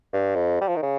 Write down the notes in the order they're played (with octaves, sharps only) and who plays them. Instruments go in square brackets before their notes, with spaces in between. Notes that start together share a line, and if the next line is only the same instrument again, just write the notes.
[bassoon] G2
F2
G3
F3
D#3
C#3